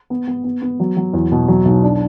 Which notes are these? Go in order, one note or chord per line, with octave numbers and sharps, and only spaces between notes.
B3
B3
B3
B3
F#3
F#3
E2
B2
F#3
B1
D4